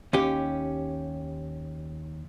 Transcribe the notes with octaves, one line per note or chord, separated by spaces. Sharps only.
D#2 C#4 G4